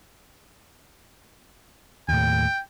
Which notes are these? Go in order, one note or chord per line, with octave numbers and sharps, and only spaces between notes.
D#2 A2 G5